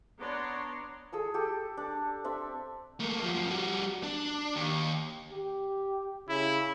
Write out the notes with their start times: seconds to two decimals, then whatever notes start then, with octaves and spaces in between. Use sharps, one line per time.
0.20 B3 D4 C#5 D5 A#5 C6
1.13 G#4 A4 E6
1.34 G4 A4
1.77 D4
2.24 C4 D4 E5
3.00 A3 A#3
3.22 F#2 F3
3.51 G3 F#4
4.04 D4
4.56 D#2
5.32 G4
6.29 C#3 E4